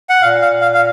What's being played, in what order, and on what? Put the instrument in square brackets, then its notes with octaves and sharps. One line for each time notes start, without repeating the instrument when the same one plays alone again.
[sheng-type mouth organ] F#5
[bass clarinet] A#2 [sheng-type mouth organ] F5
[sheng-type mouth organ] F5
F5
F5